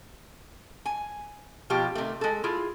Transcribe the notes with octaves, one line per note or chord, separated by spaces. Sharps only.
G#5
B2 F3 F4 G4
C3 D#3 A3
G#3 A4
E4 F4 G#4